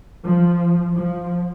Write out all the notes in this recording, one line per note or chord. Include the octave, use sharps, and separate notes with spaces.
F3
F3